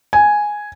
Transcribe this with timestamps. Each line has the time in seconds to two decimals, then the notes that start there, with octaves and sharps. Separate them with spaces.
0.13 G#5